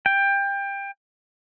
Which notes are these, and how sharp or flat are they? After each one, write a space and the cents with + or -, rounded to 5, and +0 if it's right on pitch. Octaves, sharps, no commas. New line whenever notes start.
G5 +20